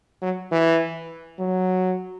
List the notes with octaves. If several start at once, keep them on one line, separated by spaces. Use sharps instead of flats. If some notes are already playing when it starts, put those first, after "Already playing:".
F#3
E3
F#3